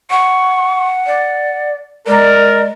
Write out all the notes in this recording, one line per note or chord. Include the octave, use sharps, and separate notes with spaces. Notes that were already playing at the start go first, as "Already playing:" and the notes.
F#5 C#6
D5
G#3 A#4 D5